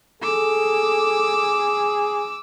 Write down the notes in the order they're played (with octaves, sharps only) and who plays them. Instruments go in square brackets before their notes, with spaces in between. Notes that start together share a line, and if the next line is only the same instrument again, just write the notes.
[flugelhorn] G#4 [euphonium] A4 [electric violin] D6 E6